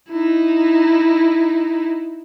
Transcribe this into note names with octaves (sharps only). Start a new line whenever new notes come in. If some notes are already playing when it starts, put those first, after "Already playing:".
D#4 E4